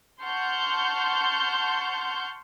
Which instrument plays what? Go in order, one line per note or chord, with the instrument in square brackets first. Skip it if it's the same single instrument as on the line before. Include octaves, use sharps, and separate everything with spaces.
[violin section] F#5 A5 C6 C#6 F6 G6